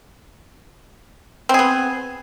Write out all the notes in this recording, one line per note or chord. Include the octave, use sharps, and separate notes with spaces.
B3 C4 G#4